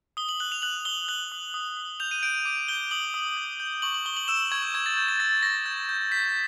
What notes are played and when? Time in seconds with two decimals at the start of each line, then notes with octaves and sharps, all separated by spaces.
0.17 D#6 G7
0.29 F#7
0.40 F#6 F#7
0.52 F7
0.62 F#6 F#7
0.85 D#6 G7
1.08 F#6 F#7
1.32 D#6
1.54 D#6
1.77 D#6
2.00 G6 F7
2.11 D#7
2.23 G6 D7
2.35 D#7
2.45 D6 D#7
2.68 G6 G7
2.91 D#6 F#7
3.14 D#6
3.37 G6
3.60 G6
3.82 C#6 F#7
3.94 F#7
4.06 C#6 G7
4.17 F#7
4.28 E6 E7
4.52 C#6 G#6
4.62 G6
4.74 C#6 G#6
4.86 A6
4.97 G6
5.08 A6
5.20 E6 A6
5.43 C#6 A#6
5.66 G6
5.89 G6
6.11 G6 B6